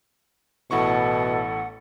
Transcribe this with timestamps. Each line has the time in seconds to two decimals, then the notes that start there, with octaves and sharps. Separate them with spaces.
0.71 A1 B2 E4 A4 F#5 C#6